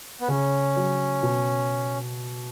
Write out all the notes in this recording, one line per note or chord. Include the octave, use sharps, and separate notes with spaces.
B3
C#3 C#4
F#3
B2